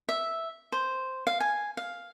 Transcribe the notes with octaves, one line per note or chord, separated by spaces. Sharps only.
E5
C5
F5
G#5
F5